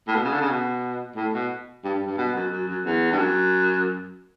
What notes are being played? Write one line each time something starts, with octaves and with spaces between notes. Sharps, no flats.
A2
B2
C#3
D3
C#3
B2
A2
B2
G2
G2
G2
B2
F#2
F#2
F#2
E2
G2
F#2